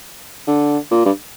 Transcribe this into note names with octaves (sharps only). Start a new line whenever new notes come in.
D3
A#2
G2